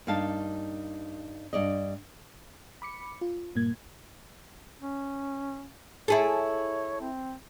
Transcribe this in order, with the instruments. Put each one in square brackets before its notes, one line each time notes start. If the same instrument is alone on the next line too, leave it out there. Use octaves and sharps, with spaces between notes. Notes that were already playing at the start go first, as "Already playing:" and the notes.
[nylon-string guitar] G2 A#3 D#4 F5 A5
G2 D5 D#5
[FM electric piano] B5 D6 C#7
F4
G2 A#2 A#3 G#6
[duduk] C#4
[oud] E4 G#4 A4 [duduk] C#5
[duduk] C4